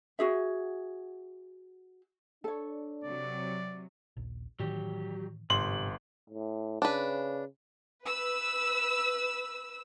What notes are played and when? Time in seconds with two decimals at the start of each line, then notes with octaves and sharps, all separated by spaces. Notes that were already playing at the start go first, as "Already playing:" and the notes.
0.19 F#4 G#4 E5
2.44 D4 A4 C#5
3.04 C3 F#3 D5
4.17 D#1 A#1
4.60 A2 D#3 E3 F#3 G4
5.50 G1 F2 G#2 C3 G4 C6 F#7
6.30 A2
6.82 C#3 D4 B4
8.05 B4 E6